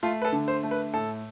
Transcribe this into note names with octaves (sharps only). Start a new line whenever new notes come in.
A3 F4
B4
A4
D3
C5
A3
B4
A2 A4